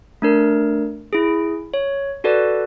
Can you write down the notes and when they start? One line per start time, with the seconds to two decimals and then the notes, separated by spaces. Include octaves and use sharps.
0.22 A3 D4 A#4
1.13 E4 G#4
1.74 C#5
2.24 F#4 A4 B4 D5